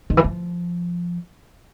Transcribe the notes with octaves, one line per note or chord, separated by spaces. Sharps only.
D#3
E3
F3